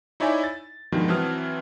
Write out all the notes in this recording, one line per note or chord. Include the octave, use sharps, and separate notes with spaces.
D#4 E4 C#5 D5 E5 G#5
A6
G2 B2 D#3 F3 G#3
E3 F#3 C4 A5 D#6 F6